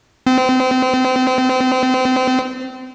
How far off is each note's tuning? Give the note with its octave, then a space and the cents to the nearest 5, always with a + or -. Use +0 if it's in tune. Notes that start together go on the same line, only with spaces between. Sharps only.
C4 -30